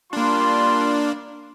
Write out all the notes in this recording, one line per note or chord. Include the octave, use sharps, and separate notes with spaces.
G3 A#3 D4 F4 C6